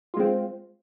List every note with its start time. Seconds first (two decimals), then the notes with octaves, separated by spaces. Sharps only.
0.14 F4
0.17 G#3
0.20 C4